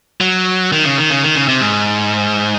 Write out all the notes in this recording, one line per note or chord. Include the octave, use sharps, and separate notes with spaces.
F#3
D#3
C#3
D#3
C#3
D#3
C#3
C3
G#2